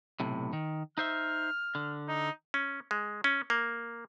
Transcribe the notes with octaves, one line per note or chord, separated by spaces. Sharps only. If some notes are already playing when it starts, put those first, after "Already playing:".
B1 A2 C3
D#3
D#4 C5 E5 F6
D3
D#4
C#4
G#3
C#4
A#3